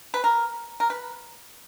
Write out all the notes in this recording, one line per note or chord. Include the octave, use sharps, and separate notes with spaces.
B4
A#4
A#4
B4